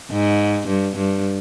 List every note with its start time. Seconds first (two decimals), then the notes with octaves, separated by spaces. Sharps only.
0.11 G#2
0.68 G2
0.96 G2